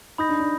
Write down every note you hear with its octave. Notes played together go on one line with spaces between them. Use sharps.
D#4 B5 D#6 G6 A#6
D4
D4